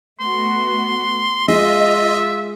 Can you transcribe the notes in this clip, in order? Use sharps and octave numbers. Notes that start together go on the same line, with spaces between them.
A3 B3 F#4 C6
G#3 F4 D#5 E5